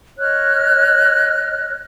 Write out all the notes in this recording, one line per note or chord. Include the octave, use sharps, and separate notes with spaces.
C#5 D#5 F6 F#6